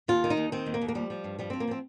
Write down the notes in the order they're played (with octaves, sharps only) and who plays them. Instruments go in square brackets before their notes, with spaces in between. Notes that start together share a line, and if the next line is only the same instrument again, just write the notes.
[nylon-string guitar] D#2 F4
D#3
D#4
D#2
D#3 C4
D#2
A#3
D#2
A#3
F3 G3
F3
G2
F3 G3
F3 C4
A#3
F3 C4